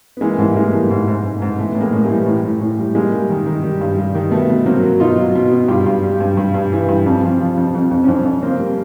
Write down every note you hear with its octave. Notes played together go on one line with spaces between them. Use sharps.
B3
E3 G#3 A#3
G#2 G3 A3
E3 G#3 A#3
G3 A3 B3
G#2
G#2
G#2
G#2
E3 A3 B3
A2
G#3 A#3
A2
G3 A3
E3
A2
A2
A2
G3
G3 G#3 A#3
G3
D#3
D#3
G3
G2
G3
D#3
B2 A3 B3
B2
F#3 A#3 C4
F#3
B2 D#4 F4
F#3
B2
B2
G2 F4 G4
G2
G3
G2
G2
G2
E3
G2
F2
F3
F3
F2
F2
F2
C#4
F2 C4 D4
F2
C#3 A#3 C4
G3